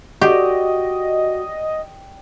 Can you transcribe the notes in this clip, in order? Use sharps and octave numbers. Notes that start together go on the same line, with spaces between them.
F#4 G4 D5 D#5 G5